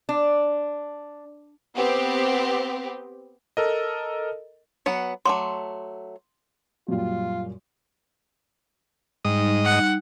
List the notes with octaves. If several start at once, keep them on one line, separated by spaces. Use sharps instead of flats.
D4
B3 C4 G4
A4 A#4 D#5
F#3 B3 F#5
F#3 A3 C6 D6
F#2 A#2 G3 F4
G#2 G3 D#4 D#5
F#5